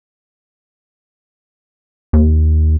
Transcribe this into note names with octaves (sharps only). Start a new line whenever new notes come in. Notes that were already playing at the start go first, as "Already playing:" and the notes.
D#2